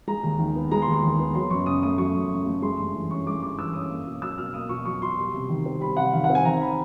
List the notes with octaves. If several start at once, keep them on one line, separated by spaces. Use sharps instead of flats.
G#3 A#5
D#2
D#3
B3
G#3 A#5
C6
D#2
C6
D#3
B3
F#3 C6
F#2 C#6
C#3 D#6
A3 D#6
F#3 C#6
F#2
C#3
A3
G#3 C6
G2
E3
C#4 C#6
G#3 D6
G2 D6
E3 E6
C#4 D#6
A#3
B2
F#3 E6
B2 F6
A#3 D#6
B2 C#6
F#3 C#6
B2 C6
G3
C3
D#3
C4
G3 B5
C3 F#5
D#3 F5
F#5
C4
G#5
D#3 A#5
B5